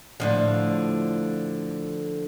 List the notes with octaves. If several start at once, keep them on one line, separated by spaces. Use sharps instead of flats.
A2 D3 F3